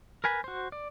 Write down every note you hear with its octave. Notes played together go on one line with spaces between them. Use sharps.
A#4 B4 G#5 B5
F#4 C5
D5